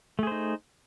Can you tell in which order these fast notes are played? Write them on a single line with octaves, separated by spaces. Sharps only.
A3 G#4 C5 D#4